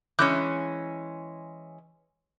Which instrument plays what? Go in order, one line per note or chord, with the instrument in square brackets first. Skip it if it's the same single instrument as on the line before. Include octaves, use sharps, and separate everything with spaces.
[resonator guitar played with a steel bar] E3 G#3 C#4 [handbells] D6 F#6 G6